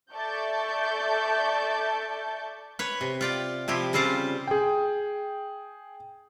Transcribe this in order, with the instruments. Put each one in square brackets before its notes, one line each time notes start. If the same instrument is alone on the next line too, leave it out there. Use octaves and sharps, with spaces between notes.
[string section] A4 D5 E5 A5 C#6 G6
[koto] B4 C#5
C3
F4 D5 G5
C3 F3 E4 G4
C#3 G3 C4 F4 C5 D5
[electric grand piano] G#4 G5